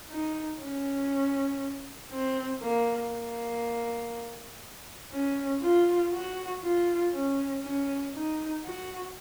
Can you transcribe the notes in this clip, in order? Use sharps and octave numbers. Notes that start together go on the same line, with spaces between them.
D#4
C#4
C4
A#3
A#3
C#4
F4
F#4
F4
C#4
C#4
D#4
F#4